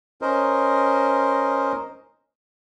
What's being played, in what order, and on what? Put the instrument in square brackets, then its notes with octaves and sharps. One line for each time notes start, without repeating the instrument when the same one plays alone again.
[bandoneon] C#4 A#4 C5 D#5